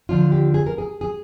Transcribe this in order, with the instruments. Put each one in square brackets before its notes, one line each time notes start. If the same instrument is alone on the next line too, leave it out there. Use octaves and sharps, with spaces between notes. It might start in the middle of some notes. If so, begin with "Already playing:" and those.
[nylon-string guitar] D#2 D3 F3 F4
G4
G#4
A#4
G#4
G#4